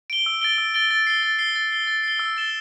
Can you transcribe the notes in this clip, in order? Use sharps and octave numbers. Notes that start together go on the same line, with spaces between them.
D7 G7
E6
A6 D7 G7
E6
A6 D7 G7
A6
C7 G7
A6
C7 G7
A6
C7 G7
A6
C7 G7
E6
A6 E7 G7